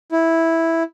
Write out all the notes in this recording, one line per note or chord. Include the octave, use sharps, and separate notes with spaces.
E4